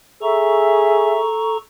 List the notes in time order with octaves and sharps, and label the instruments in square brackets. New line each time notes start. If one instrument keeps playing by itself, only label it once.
[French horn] G#4 [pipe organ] A4 A#5 C#6 [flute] E5